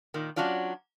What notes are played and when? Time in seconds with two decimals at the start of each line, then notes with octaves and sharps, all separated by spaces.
0.14 A#2 D#3
0.36 F#3 C#4 D4 F4 D5